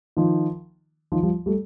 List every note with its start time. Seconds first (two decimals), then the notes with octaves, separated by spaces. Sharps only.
0.17 D#3 F3
1.12 D#3 F3
1.23 F3 G3
1.46 G3 A3